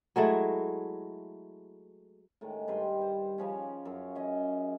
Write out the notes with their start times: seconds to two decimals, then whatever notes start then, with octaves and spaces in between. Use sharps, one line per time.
0.16 F#3 G#3 A3 E4
2.41 A2 D#3 G#3
2.68 G2 G3 B4 C6
3.02 C5
3.38 C#3 F3 C#4
3.85 F#2
4.15 C#4 D#5